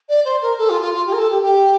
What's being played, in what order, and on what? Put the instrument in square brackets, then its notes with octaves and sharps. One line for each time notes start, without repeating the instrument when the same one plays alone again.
[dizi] D5
C5
A#4
A4
F4
F4
F4
G4
A#4
A4
G4
G4